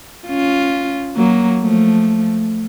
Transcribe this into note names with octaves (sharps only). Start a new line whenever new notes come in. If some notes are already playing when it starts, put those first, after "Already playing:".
C#4 F4
F#3 A#3
F3 A3